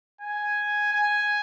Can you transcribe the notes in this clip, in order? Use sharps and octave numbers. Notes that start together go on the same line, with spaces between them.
G#5
G#5